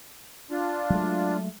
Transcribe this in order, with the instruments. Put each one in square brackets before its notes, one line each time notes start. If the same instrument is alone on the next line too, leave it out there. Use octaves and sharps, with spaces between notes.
[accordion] D4 F4
[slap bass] F#3 G#3 A3